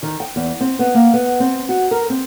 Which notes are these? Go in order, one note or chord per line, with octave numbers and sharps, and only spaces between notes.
D#3
G5
E2
C4
B3
A#3
B3
C4
F#4
A#4
C4